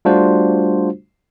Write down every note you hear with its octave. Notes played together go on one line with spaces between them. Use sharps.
G3 A3 D4 F4 F#4 C5